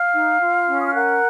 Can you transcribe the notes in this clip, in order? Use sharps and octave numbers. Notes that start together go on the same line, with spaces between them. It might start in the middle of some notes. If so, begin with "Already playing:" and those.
Already playing: F5 F6
D#4
F4
C#4
D#6
F6
A#4 F#5 F#6